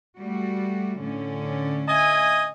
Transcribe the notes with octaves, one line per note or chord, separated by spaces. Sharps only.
G3 A3 F#4
A2 D3 C#4
D#5 E5 G#5